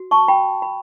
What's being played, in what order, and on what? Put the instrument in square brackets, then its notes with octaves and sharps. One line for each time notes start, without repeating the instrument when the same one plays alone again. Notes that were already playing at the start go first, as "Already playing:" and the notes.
Already playing: [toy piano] F#4
A5 C#6
G5 B5
B5